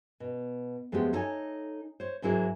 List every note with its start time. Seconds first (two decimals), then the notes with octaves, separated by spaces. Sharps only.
0.20 B2
0.92 F2 G#3 A3 B3 G4
1.13 D#4 A4 C#5 G#5
2.00 C5 C#5
2.22 G#2 F#3 A#3 E4 G#4